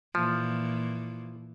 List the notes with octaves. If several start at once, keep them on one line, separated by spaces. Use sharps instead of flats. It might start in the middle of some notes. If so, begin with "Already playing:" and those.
A#2 E3 F3